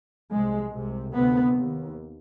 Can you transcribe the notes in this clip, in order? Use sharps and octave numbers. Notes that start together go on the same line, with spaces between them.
C2 C3 G#3
C2 C3
D2 C3 B3
D#2